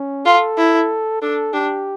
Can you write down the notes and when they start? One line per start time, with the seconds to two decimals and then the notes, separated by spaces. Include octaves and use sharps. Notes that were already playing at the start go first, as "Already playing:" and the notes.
Already playing: C#4
0.26 F4 A4
0.58 E4
1.22 D4 A4
1.53 D4 G4